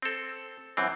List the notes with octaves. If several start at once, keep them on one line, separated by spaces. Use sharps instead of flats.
C4 A4
F#2 E3 C4